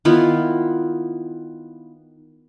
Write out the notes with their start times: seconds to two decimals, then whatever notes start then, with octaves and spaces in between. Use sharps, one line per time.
0.05 D#3 B3 E4 F4